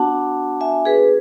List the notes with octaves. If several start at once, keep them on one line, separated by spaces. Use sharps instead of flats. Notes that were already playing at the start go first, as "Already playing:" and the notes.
Already playing: B3 D4 F#4 F#5 A5
E5 G#5
G#4 B4